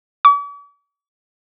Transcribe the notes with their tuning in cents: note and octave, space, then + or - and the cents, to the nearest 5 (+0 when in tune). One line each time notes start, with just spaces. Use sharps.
D6 -45